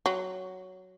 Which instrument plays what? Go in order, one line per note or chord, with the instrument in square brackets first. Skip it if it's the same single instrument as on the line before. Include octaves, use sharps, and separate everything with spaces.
[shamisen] F#3